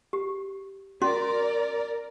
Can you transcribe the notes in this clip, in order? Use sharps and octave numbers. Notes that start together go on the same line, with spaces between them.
G4
C#4 F#4 A#4 D5 C6